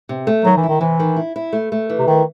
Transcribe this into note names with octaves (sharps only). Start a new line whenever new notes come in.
C3
A3
D#3 F#3
E3
E4
D#3
C3 E3
D#3
E4
E4
A3
A3
E3
C3
D#3 E4